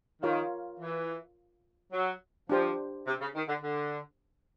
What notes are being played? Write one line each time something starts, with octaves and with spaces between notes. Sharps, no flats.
D#3 F4 A#4 C#5 F5
E3
F#3
F3 D4 G4 C5
C3
C#3
D#3
D3
D3